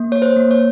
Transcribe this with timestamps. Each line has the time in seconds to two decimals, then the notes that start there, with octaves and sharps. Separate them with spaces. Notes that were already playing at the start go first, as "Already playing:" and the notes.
Already playing: A#3
0.12 C#5
0.22 C5
0.37 A#3
0.51 C#5